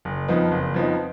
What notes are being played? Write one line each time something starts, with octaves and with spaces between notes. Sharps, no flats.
F#1
F2 F3 B3 D#4
F#1
F2 F3 B3 D#4